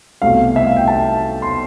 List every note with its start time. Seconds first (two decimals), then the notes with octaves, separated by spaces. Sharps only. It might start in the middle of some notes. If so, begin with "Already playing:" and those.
0.22 C2 B2 A3 F5
0.56 E5
0.67 F5
0.77 G5
0.88 A5
1.42 C6